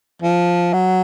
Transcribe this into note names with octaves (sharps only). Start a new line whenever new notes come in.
F3
F#3